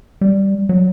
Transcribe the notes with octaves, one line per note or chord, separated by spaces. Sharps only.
G3
F#3